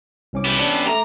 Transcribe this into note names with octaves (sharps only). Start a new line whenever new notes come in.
C2 C#4 D6
B3 G4
C#4 D4
A3 A#5 D6 A#6